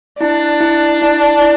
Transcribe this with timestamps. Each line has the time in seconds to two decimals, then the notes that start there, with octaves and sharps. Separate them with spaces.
0.21 D4 E4
0.61 E4
1.02 E4
1.42 E4